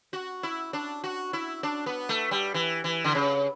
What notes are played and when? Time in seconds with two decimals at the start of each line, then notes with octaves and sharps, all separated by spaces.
0.13 F#4
0.43 E4
0.73 D4
1.04 F#4
1.33 E4
1.63 D4
1.86 B3
2.09 A3
2.31 G3
2.54 E3
2.84 E3
3.04 D3
3.15 C#3